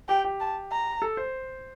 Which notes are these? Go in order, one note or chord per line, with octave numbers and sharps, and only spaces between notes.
G4 G5
G4
A5
A#5
A4
C5